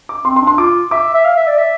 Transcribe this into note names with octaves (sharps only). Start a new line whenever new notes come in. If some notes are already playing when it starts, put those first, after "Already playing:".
D6
C4 C6
C6
D4
C6
F4 D6
E5 D6
E5
F5
E5
D5
E5